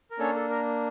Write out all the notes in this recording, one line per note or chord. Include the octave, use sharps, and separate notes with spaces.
A#4
A#3 C#4 D4 A4 C#5
A4
A#4